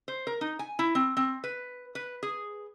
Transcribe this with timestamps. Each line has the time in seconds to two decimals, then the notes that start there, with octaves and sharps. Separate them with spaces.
0.08 C5
0.27 A#4
0.41 D#4
0.59 G#5
0.79 E4
0.95 C4
1.17 C4
1.44 B4
1.95 B4
2.23 G#4